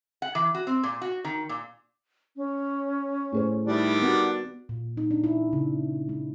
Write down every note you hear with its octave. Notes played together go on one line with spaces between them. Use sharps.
F#5
E3
F#4
C4
A#2
F#4
D#3
A#2
C#4
A2 G#4 C5
D#3 G3 D4 E4
B3 F#4 F#5
A#2
D#4
D4
E4
C#3
G#3